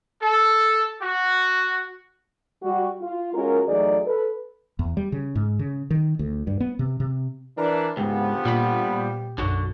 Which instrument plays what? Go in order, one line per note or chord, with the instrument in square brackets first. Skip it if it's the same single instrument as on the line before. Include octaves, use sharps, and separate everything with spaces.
[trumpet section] A4
F#4
[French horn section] G3 F#4
F4
G#3 C#4 F4 F#4 A#4
E2 F#3 A3 D#4 G#4 D5
A4 B4
[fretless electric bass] E2
G3
C#3
G#2
C#3
D#3
D2
G2
B3
C3
C3
[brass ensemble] E3 D4 [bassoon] A#4
[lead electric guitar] C#2 G#2 [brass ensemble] D3 F3 B3 [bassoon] G4
[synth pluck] A#2 [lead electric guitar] G3 B5
[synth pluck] B1 F#2 [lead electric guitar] D3 F#4